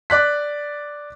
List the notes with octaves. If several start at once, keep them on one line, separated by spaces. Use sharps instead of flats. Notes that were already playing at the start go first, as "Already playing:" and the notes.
D5 F#6 B6